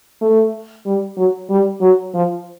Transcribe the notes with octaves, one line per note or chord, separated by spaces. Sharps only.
A3
G3
F#3
G3
F#3
F3